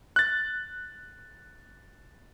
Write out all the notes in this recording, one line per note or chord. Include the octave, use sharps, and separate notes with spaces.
F#6 A6